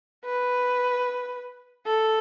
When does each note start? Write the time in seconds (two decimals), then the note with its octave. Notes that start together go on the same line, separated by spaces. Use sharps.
0.25 B4
1.86 A4